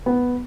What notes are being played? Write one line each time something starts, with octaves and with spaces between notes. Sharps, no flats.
B3